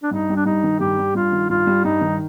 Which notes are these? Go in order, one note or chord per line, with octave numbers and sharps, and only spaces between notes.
D4
G2 D#4
G3
D4
G2 D#4
D#3
G2 G4
G3
G2 F4
D#3
G2 F4
G3
G2 D#4
D#3